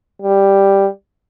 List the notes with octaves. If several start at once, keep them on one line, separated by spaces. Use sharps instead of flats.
G3